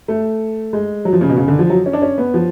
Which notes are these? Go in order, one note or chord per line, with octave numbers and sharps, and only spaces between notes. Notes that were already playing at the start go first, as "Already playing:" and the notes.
A3
G#3
F#3
F3
C#3
B2
C#3
D3
F3
F#3
C#4
D4
C#4
B3
F3